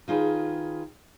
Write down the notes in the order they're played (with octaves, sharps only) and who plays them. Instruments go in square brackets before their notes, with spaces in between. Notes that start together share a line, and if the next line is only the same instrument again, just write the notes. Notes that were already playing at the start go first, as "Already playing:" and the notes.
[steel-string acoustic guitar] D#3 F4 G#4 B4